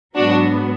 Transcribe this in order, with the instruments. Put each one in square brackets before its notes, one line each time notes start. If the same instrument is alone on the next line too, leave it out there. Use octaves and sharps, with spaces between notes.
[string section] G#2 F#3 B3 D4 F#4